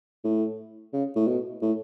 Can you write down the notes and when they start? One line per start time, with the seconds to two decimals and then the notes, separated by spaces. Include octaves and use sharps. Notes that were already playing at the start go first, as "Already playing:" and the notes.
0.24 A2
0.93 C#3
1.16 A2
1.28 B2
1.62 A2